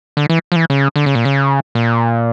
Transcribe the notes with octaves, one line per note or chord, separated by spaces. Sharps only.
D3
E3
F3
E3
C#3
D3
C#3
A#2
C#3
A#2